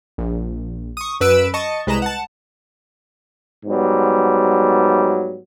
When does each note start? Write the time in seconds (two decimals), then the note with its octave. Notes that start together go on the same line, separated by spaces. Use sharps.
0.18 A#1
0.97 C#6 D#6
1.21 F#2 B4 E6 D7 E7
1.54 D#5 A5 C#6
1.87 C2 G#3 B4 D#5 A#5 E7
2.02 F#5 A5
3.65 G#2 F#3 G3 B3